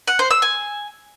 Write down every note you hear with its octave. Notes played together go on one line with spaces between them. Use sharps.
F#5
C5
E6
G#5